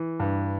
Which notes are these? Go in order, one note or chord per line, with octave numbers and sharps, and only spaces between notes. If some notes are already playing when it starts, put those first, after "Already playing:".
Already playing: E3
G2